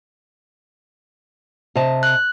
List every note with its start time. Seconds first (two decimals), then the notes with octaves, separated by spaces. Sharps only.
1.75 C3 D#5 A5
2.03 F#6